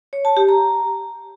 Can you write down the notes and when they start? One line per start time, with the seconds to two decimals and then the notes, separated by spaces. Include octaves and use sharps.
0.13 C#5
0.25 A5
0.37 G4
0.49 A#5